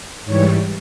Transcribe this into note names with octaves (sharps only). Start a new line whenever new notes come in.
G#2 E3 G3 C#5